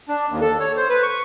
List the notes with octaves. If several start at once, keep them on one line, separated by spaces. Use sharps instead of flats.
D4
D#2
A4
C#5
C5
B4
C#6